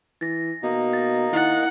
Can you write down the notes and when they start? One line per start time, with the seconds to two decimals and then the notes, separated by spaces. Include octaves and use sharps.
0.21 E3 A6 A#6
0.63 B2 A#3 D#4
0.93 A6 A#6
1.33 D#3 E4 F#5 A6